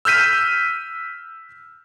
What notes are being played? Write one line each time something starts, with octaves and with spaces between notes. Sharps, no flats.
E6 F6 G6 B6 D#7